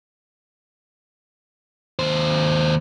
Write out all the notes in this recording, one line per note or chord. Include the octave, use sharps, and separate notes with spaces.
D#2 C5